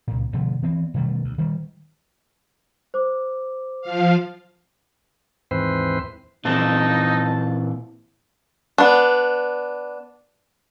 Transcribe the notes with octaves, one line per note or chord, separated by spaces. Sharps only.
C#2 A#2
B2 D3 F3 A3
E3 B3 C4
B2 D#3 G3 A3
D2
D#3 G3
C5 D6
F3 F5
D#2 G#2 E3 C4 B4 C5
A#2 E3 C4 D#4 A5
B3 D4